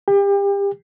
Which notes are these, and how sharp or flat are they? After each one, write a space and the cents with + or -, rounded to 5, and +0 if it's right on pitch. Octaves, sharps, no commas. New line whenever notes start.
G4 +30 G5 +35